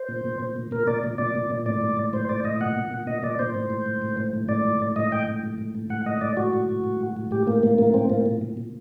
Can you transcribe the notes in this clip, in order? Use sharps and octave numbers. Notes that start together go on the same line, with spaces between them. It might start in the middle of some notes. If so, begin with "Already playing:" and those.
Already playing: C5
A#2
A#2
A#2
A#2
A#2 A#4
A#2 D5
A#2
A#2 D5
A#2
A#2
A2 D5
A2
A2
A2 C5
A2 D5
A2 D#5
A#2 F#5
A#2
A#2
A#2 D#5
A#2 D5
A#2 C5
A2
A2
A2
A2
A2
A2
A2 D5
A2
A2
A2 D#5
A2 G5
A2
A2
A2
A2
A2 F#5
A2 D#5
A2 D5
A2 F#4
A2
A2
A2
A2
A2
A2 G4
A2 A#3
A2 A#3
A2 A#3
A2 C4
A2 A#3
A#2
A#2
A#2